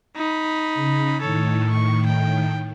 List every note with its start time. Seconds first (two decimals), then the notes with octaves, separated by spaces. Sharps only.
0.16 D#4 B5
0.75 C#3
1.22 A2 D#3 A4 C#5
1.70 C#6
2.07 G5